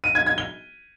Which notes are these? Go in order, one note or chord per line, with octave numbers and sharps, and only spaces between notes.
D#7
G#6
G#6
G7